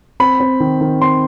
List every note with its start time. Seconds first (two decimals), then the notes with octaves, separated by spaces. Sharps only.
0.20 C4 B5
0.40 C4
0.60 D#3
0.81 D#3
1.01 C4 C6